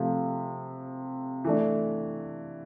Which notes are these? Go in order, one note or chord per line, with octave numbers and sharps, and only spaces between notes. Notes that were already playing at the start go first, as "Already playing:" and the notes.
Already playing: C3 F3 A3
E3 A3 D4